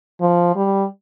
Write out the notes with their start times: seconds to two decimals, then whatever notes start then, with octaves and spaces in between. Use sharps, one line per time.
0.21 F3
0.56 G3